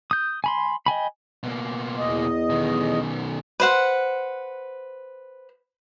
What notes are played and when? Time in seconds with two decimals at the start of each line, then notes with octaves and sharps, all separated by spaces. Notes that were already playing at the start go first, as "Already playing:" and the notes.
0.11 D#6 G6
0.44 G#5 B5 C6
0.86 D#5 G5 G#5 B5
1.43 B2 A#3
1.98 E2 D#5
2.50 B2 D#3
3.60 B4 C5 F#5